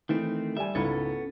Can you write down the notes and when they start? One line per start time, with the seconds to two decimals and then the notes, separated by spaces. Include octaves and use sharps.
0.09 D#3 E3 A3 C4
0.57 G3 E5 G#5
0.75 C#2 G#2 B3 C#4 E4 A4